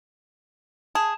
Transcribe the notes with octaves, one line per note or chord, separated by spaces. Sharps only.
G#4 A5